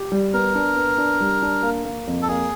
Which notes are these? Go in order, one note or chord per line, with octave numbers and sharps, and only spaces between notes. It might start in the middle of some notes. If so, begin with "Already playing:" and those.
Already playing: G4
G3
B3 A#4
D4
B3
D4
G3
D4
A#3
A#3
F2
A4
A#3 G#4